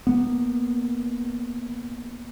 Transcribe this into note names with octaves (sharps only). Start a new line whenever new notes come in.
A#3 B3